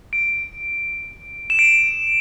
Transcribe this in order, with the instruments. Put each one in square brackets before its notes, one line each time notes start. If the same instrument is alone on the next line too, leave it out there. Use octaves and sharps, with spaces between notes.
[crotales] D7
E7
D7